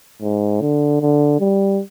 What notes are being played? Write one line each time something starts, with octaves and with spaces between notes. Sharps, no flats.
G#2
D3
D3
G3